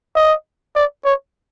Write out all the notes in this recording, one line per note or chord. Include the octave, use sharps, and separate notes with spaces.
D#5
D5
C#5